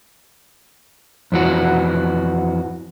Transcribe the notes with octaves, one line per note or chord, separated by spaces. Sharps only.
F2 E3 F#4